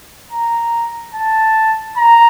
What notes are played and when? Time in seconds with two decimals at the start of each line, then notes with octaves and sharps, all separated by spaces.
0.32 A#5
1.14 A5
1.97 A#5